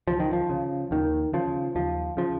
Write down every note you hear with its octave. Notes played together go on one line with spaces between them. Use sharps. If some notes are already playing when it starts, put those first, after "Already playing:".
C#2 F3
D#3
F3
C#3
D#2 D#3
C#3 F3
D#2 F3
C#3 F3